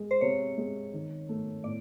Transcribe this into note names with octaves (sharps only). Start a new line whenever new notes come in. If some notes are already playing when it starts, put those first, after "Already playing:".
Already playing: G#3
C5
C3 C#5
G#3
D#3
A3
A2 D5